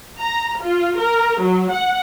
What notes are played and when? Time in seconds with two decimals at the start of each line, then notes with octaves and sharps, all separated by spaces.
0.21 A#5
0.62 F4
0.99 A#4
1.41 F#3
1.72 F#5